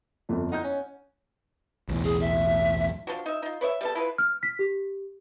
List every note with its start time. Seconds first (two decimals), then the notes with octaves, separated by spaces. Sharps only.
0.29 G1 F2 D4
0.52 D#4 F#5 G6
0.64 C#4
1.89 B1 E2 A2
2.04 G#4
2.21 E5
3.07 F3 D4 F#4
3.26 D#4 E5
3.42 D#4 F4
3.61 B4 C#5 D5 E5
3.81 G3 B3 A4
3.95 E4 F4 G4 B4
4.18 F6
4.43 B6
4.59 G4